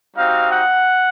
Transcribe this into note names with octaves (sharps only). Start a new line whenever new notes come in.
G3 C4 D#4 F#4 F5
F#5